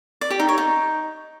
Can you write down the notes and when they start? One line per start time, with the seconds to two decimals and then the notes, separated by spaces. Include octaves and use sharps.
0.21 D5
0.30 G4
0.40 D#4
0.49 C#5
0.58 D#4